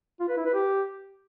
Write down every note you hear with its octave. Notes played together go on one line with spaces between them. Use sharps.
F4
B4
E4
B4
G4